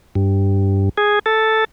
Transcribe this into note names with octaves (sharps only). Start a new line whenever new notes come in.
G2
G#4
A4